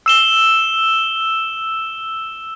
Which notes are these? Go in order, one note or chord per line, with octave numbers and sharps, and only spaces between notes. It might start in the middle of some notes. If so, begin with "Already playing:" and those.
E6 E7 G7